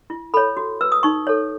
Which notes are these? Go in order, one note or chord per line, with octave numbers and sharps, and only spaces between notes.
E4
A4 C#5 B5
F#4
B4 E6
D#6
D#4 C#6
A4 C#5